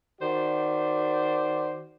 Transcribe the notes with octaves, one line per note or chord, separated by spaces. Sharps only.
D#3 F#4 C5 D5